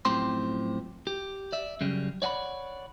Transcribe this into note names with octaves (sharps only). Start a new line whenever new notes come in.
F#2 A2 F3 C4 G4 C6
G4
D5 E5
F#2 C#3 G3
C#5 D5 F#5 G#5 B5